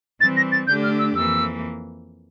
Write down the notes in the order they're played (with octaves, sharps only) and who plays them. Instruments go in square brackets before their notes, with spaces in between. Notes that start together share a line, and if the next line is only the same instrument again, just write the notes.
[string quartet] E3 G3 C4 [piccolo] A6
[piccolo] A#6
A6
[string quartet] D3 A3 D4 G4 [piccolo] G6
[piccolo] F6
E6
[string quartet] F2 E3 A#3 [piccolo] E6